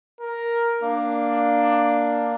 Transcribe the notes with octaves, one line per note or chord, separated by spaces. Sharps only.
A#4
A#3 D4